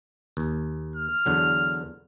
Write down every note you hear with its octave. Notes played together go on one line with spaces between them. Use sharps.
D#2
F6
E2 D3 F#3